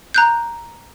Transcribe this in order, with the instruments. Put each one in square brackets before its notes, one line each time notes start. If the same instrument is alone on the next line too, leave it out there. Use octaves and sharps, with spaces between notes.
[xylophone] A#5 F#6 G6